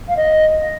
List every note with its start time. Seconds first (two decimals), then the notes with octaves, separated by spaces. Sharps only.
0.09 F5
0.17 D#5